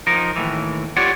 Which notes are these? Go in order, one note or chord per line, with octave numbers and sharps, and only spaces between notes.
F3 D#4 A#4
D#2 A2 E3
F4 G4 C#5 D5 F#5